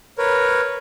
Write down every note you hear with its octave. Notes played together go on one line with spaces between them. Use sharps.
A#4 B4 C#5